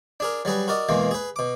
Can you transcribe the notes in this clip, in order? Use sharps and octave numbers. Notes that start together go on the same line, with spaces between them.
D4 G#4 A#4
F#3 G3 G#4 B4
F#4 A#4 D5 D#5
E2 B2 E3 G#3 A#3
G#4 B4
B2 D6